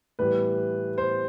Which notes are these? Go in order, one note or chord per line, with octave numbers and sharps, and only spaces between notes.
A2 E3 G3 B3 B4
C5